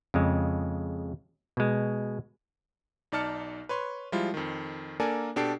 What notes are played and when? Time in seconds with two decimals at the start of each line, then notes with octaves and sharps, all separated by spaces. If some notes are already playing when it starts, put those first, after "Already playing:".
0.14 F2 C#3 G#3
1.57 B2 G#3
3.12 B1 D#4 D5 A5 F6 C#7
3.69 B4 C#5 C6
4.12 F3 G3 G#3 E4 F4
4.34 F2 D#3
5.00 A#3 D4 A4 A#4 D5 G#5
5.36 B2 D4 G4 A4 C7 D7